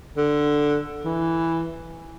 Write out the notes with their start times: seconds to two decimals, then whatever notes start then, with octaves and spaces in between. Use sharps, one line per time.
0.17 D3
1.05 E3